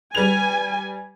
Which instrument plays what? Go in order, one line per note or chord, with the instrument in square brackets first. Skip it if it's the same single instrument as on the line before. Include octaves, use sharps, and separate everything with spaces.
[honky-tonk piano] G3 B4 F7 [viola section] G#5